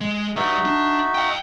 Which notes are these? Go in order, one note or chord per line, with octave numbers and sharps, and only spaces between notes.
G#3
G3 D#4 F#4 B4 E5
D4
F5 G5